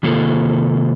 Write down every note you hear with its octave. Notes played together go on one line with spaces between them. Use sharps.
C3 D#3 A#3 F4 A4